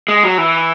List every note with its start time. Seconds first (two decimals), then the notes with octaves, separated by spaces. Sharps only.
0.08 G#3
0.23 F#3
0.38 E3